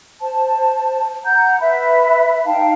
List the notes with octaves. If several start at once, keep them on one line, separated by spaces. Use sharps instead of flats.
C5 A5
F#5 A#5 G6
B4 E5 B5
D#4 F5 G5 A5